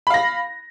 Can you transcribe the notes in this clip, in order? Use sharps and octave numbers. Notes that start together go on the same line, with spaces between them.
F5 B5 A#6